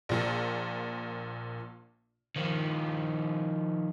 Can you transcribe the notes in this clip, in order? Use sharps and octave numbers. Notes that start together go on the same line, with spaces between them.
A#1 A#2
D#3 F3